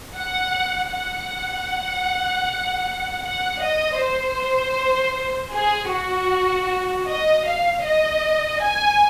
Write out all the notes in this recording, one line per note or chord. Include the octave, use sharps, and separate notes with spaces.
F#5
F#5
F#5
D#5
C5
G#4
F#4
D#5
F5
D#5
G#5